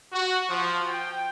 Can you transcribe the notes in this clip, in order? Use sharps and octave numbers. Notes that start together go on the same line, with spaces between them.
F#4
F3
G5